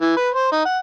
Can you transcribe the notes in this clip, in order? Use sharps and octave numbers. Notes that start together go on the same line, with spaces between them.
E3
B4
C5
D#4
F#5